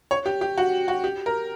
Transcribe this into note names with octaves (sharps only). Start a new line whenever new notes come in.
C#5
G4
G4
F#4
F#4
G4
A#4